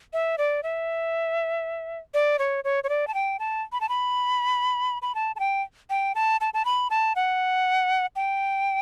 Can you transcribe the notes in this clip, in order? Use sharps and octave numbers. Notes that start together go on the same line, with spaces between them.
E5
D5
E5
D5
C#5
C#5
C#5
D5
A5
G5
A5
B5
A5
B5
B5
A5
A5
G5
G5
A5
A5
A5
B5
A5
F#5
G5